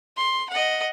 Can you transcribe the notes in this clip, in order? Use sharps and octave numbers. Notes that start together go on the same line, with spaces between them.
C6
D#5 F#5